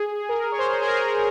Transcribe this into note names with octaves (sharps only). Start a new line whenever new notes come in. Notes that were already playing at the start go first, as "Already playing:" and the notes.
Already playing: G#4
A#4
C#5
C5
G#4
A#4